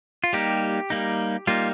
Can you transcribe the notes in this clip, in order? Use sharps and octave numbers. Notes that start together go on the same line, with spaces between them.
F4
G3 A#3 D#4 G4
G3 A#3 D#4
G3 A#3 D#4 F4